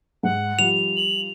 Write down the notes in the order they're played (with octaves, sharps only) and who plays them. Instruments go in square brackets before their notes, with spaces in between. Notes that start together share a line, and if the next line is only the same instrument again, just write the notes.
[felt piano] G#2 [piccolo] F#5
[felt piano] F3 G3 [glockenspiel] F7
[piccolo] F#7